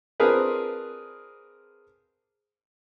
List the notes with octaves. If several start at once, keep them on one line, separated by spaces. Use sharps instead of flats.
C4 D4 F4 G#4 A#4 B4